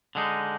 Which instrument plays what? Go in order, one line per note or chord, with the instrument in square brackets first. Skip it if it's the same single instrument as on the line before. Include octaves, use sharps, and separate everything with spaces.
[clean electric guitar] D3 G#3 D#4